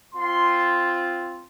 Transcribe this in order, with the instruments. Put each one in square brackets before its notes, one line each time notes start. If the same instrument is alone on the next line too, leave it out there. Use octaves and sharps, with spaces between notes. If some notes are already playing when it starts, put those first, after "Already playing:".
[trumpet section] C4 F4 C6